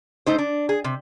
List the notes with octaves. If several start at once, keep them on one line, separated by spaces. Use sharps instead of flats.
A3 D#4 C5
D4
G#4
C3